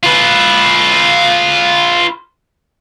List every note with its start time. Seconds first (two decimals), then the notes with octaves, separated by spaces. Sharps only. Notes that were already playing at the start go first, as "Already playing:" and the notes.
0.03 F4 B4